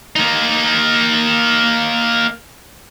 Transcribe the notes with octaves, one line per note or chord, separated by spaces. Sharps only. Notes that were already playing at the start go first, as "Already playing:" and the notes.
A#3 D#4